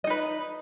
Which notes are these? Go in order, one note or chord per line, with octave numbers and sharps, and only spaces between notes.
D#4 B4 D#5